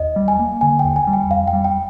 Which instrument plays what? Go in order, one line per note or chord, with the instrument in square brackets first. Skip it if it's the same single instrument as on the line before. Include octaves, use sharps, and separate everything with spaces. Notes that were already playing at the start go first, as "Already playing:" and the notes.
Already playing: [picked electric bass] D#2 [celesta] D#5
[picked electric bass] G3
[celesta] G#5
[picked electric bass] A#3
[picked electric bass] D3 [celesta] G#5
[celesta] G5
[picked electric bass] D#2
[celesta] G#5
[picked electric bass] G3
[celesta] G5
[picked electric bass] F2 [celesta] F5
[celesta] G5
[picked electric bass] G3
[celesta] G5